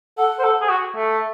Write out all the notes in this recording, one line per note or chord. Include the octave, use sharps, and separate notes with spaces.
A4 F#5
C5
A4
G#4
F#4
A3